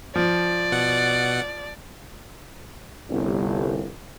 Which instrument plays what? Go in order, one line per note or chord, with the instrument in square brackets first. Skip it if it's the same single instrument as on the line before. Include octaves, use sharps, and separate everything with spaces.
[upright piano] F3 [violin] D5
[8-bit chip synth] B2 F#5
[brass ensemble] G1 C2 A2